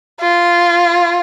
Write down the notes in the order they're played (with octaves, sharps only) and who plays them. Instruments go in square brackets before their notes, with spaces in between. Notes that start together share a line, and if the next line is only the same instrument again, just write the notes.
[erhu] F4